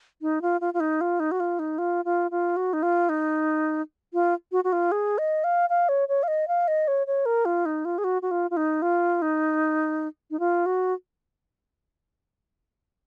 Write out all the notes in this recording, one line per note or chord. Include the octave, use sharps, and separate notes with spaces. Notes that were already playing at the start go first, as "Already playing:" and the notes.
D#4
F4
F4
F4
D#4
F4
D#4
F#4
F4
D#4
F4
F4
F4
F#4
D#4
F4
D#4
F4
F#4
F#4
F4
G#4
D#5
F5
F5
C#5
C#5
F5
D#5
F5
D#5
C#5
C#5
A#4
F4
D#4
F4
G#4
F#4
F#4
F4
F4
D#4
F4
D#4
D#4
F4
F#4